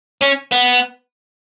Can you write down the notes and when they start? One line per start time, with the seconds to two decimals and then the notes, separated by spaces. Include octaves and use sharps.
0.22 C#4
0.52 B3